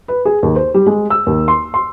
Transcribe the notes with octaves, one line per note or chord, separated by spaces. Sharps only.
B4
G#4
D#2
C5
G3
G#3
E6
D#2
C6
C6